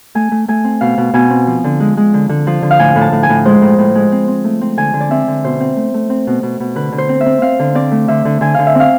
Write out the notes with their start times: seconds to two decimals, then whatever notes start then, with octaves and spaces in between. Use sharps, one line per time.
0.15 A3 G#5
0.31 A3
0.48 A3 G#5
0.64 C4
0.81 B2 F5
0.98 B2
1.14 B2 G#5
1.30 C4
1.47 F3
1.64 D3
1.80 G#3
1.97 G#3
2.14 D3
2.29 D3
2.47 F3
2.62 D3
2.71 F5
2.79 A2 G#5
2.96 A2
3.01 A5
3.12 A2
3.23 G#5
3.29 A2
3.46 G#3 C5
3.62 A2
3.79 A2
3.95 G#3
4.12 C4
4.28 C4
4.44 A3
4.62 C4
4.77 D3 G#5
4.94 D3
5.01 D5
5.11 C4 E5
5.28 D3
5.44 B2 C5
5.60 C4
5.76 A3
5.94 A3
6.10 C4
6.27 B2
6.43 B2
6.60 B2
6.76 D3 B4
6.92 D3
6.98 C5
7.09 C4
7.21 E5
7.26 C4
7.42 C4 F5
7.59 D3
7.75 C4 D5
7.92 A3
8.08 D3 E5
8.25 D3
8.41 D3 G#5
8.54 D3 F5
8.67 E5
8.75 C4 F5